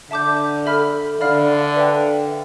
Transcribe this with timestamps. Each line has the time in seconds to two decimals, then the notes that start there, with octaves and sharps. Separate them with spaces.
0.10 D3 E5 A5 D6 G6
0.66 A4 E5 B5 F6
1.20 D3 D5 F5 B5 F6
1.76 B4 E5 G5